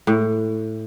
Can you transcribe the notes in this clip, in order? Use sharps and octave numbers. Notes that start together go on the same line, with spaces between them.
A2